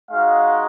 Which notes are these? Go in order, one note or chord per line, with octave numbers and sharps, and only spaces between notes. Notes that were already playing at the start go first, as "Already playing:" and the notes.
G#3 D#4 F#4 F5